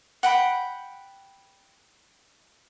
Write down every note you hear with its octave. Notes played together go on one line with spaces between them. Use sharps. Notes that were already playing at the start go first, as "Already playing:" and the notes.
F#5 G5 B5